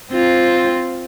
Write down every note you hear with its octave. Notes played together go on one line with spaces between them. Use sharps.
C4 F4